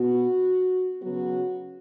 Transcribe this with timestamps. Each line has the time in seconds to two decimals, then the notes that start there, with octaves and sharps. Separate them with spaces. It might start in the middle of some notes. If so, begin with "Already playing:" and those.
Already playing: B2 B3 F#4
1.01 C#3 F#3 B3 F#4